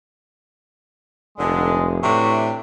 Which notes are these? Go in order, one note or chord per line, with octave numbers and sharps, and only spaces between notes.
F1 D3 G#3
A2 C3 E3 D4 F#4